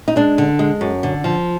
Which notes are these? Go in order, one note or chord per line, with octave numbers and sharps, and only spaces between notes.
D#4
G#3 D4
D3
G#3
F#2
D3
F3